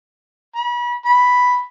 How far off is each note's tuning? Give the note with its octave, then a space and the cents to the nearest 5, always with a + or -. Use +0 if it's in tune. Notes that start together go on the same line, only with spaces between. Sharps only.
B5 -35
B5 +0